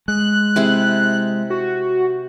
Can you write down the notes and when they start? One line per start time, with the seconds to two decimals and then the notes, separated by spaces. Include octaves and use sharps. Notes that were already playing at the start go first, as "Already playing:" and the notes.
0.08 G#3 F#6
0.56 C3 E4 G#4
1.50 F#4